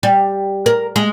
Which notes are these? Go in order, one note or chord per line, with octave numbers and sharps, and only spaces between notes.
G3
A#4
G#3